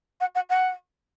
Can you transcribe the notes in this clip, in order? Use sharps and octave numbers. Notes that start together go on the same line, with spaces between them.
F#5
F#5
F#5